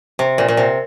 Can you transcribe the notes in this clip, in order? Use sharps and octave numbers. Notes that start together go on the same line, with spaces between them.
C3
A#2
A#2
C3